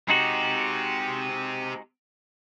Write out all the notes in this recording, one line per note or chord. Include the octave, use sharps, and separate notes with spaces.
G#3 C4 D#4 F#4 G4